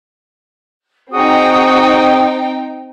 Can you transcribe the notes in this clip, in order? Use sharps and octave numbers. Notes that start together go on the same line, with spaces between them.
C4 D#4 F#4 G#4 G5 D#6